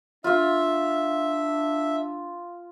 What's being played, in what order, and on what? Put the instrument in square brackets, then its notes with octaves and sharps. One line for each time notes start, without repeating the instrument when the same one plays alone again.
[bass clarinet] D4 [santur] F4 F5 [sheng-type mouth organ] E5